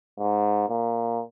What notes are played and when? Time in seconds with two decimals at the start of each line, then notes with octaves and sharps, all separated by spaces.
0.19 G#2
0.69 A#2